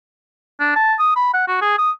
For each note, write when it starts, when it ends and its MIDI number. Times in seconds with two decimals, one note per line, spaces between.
0.60 0.71 62
0.76 0.94 81
0.99 1.14 87
1.16 1.30 83
1.34 1.43 78
1.48 1.60 66
1.62 1.75 68
1.78 1.91 87